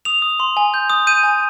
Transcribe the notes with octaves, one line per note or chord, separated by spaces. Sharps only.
D#6 F7
D#6
C6
G#5
G6
D#6
G6 D#7
G#5